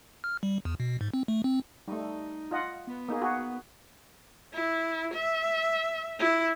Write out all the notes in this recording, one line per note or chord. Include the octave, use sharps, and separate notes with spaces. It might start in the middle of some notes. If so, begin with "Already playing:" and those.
F6
G3
E2
B2
G#2
C4
A3
C4
G3 A3 D#4
F4 D#5 F#5
B3
A#3 D#4 G#4
F#4 G#4
E4
E5
E4